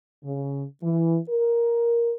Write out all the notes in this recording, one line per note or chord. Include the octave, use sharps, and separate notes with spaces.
C#3
E3
A#4